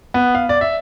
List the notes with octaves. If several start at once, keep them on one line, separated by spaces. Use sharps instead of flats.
B3
F5
D5
E5